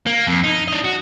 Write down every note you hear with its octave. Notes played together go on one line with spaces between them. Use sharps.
A#3
F2
D#4
D4 D#5
F#4